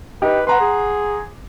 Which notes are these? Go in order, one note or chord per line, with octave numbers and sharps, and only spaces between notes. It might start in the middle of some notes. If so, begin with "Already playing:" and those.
D#4 G4 B4
B4 F#5 A#5 C6
G#4